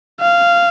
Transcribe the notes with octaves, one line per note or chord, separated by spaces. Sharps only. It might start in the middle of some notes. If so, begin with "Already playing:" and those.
F5